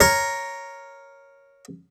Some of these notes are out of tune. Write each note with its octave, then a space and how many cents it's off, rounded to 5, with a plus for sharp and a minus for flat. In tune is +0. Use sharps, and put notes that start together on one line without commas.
A#4 +0 C#5 -5